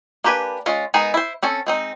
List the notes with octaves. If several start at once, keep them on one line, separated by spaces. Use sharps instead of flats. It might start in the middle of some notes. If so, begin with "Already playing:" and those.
A#3 D4 G4 B4 G#5
G#3 C#4 F4
G#3 B3 D#4 G#4 A#4
E4 C5
C4 C#4 A4
G#3 C4 D#4